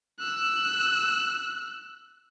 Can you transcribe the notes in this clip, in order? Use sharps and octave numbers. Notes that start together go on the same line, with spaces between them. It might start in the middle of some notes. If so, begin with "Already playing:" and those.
E6 F#6